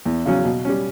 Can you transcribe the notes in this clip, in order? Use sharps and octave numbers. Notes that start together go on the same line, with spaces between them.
E2
C#3 F#3 C#4
B2
G3 C#4